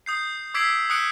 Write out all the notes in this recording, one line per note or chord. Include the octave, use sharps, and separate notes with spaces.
D#6 G6 C7
D6 E6 G#6 B6 C7 D7
D#6 E6 F#6 B6 C#7 D7